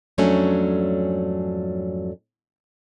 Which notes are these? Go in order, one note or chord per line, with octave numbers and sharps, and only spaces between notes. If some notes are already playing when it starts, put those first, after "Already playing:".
F2 G#2 F#3 A3 C#4 D4